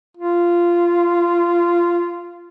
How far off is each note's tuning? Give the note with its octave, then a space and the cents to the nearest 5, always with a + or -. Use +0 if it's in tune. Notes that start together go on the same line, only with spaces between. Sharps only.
F4 -15